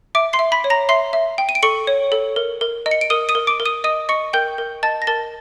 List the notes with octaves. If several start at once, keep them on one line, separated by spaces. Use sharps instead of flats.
E5 D6 D7
C6 C7
E5
B5 B6
C#5
A#5 A#6
E5 C6 C7
E5
G5
D#7
D7
A4 C#6 C#7
C#5
A4
A#4
A#4
D#5
C#7
D7
A#4 D#6 D#7
D#6 D#7
A#4
D6 D7
A#4
D#6 D#7
D#5 D#6 D#7
D#5 C#6 C#7
A#4 G5 G6
A#4
D#5 A5 A6
A#6
A#4 A5 A6